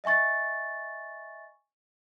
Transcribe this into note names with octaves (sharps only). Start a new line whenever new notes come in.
D#5 E5 G#5 C#6 A6